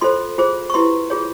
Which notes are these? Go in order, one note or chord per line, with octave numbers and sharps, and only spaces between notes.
F4 A4 C5 C6
F4 G#4 C5
C#6
E4 G4 B4 C6
F4 G#4 C#5